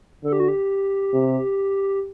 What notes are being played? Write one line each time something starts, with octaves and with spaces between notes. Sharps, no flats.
D3 A4
G4
F#4
G4
C3